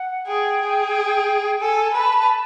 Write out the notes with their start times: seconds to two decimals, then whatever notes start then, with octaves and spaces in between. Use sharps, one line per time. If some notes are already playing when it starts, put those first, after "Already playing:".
Already playing: F#5
0.27 G#4 G5
0.61 G#4
1.60 A4 G#5
1.94 B4 A5
2.29 A5